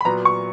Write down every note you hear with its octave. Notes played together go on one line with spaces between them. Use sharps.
B5
A#2 F#3 B3 A#5
C#6